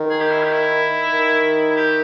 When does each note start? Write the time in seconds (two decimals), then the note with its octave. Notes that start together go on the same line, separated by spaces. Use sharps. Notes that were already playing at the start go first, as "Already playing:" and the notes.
Already playing: D#3
0.10 G#4
0.20 G4
0.31 E4
0.43 G4
0.52 E4
1.13 D#3
1.70 E4
1.76 G4